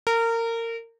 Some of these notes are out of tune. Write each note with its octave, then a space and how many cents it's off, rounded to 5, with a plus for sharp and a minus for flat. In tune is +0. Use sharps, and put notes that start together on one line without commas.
A#4 -25